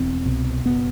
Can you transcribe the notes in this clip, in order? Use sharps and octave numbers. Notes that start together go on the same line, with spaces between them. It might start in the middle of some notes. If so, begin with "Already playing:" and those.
Already playing: E1 E2 C4
C2 B2
F#1 B2 B3